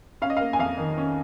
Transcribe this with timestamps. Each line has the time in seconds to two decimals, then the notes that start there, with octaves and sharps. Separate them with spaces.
0.22 C#4 F5
0.30 D#5
0.37 A#3 F5
0.53 G#5
0.59 F2 F5
0.78 D#3
0.97 C#4